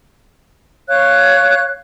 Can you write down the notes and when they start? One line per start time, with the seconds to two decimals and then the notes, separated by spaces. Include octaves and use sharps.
0.88 C#5 F5 F#6